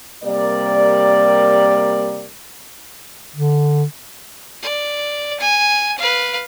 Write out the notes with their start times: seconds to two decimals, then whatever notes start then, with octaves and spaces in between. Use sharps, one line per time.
0.24 C3 G3 A#3 A#4 D5
3.36 D3
4.63 D5
5.40 G#5
5.98 B4 F5